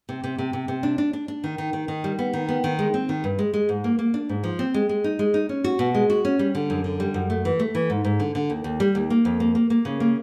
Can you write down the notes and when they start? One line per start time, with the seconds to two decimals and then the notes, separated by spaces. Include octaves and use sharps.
0.09 C3
0.24 C3
0.38 C3
0.53 C3
0.68 C3
0.83 D4
0.98 D4
1.13 D4
1.28 D4
1.44 D#3
1.58 D#3
1.73 D#3
1.88 D#3
2.04 G3
2.19 B3
2.33 D#3
2.49 B3
2.64 D#3
2.79 G#3
2.94 C4
3.09 D#3
3.24 G2
3.39 G#3
3.53 G#3
3.69 G#2
3.84 A#3
3.99 A#3
4.14 D4
4.29 G#2
4.44 F3
4.59 C4
4.74 G#3
4.89 G#3
5.04 D#4
5.19 G#3
5.34 D#4
5.49 C#4
5.64 F#4
5.79 B2
5.94 G#3
6.10 F#4
6.25 C#4
6.39 G3
6.55 D3
6.70 F#2
6.84 D3
7.00 G3
7.14 F#2
7.30 A3
7.45 E3
7.59 A3
7.75 E3
7.90 G#2
8.04 G#2
8.20 D3
8.35 D3
8.50 D#2
8.64 D#2
8.80 G3
8.95 D#2
9.10 A#3
9.25 F2
9.40 A#3
9.55 A#3
9.70 A#3
9.85 C#3
10.00 A#3